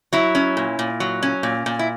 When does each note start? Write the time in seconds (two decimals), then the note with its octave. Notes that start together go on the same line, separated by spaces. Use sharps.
0.13 F#3 E4
0.35 C#4
0.57 A#2
0.79 A#2
1.00 F#3
1.23 C#4
1.43 A#2
1.66 A#2
1.79 E4